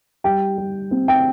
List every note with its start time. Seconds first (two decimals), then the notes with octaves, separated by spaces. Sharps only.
0.24 G3 G5
0.58 G3
0.91 C4
1.08 G5